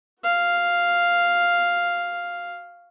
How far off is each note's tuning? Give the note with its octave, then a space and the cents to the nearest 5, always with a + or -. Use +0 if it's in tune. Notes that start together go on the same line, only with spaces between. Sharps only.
F#4 +0 F5 +0